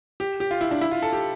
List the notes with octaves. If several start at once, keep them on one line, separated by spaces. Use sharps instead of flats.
G4
G4
F4
E4
D4
E4
F4
A4
G4